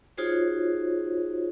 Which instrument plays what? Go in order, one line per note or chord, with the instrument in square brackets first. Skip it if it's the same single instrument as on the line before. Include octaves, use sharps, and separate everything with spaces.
[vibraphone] D#4 F4 F#4 G#4 C5 C#5